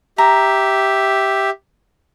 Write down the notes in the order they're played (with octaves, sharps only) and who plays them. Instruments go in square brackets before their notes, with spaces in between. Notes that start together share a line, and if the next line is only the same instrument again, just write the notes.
[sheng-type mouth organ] G4 E5 [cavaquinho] A#5